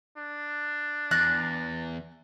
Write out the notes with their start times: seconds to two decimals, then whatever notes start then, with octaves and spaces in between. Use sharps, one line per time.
0.17 D4
1.11 E2 F#6 A6 A#6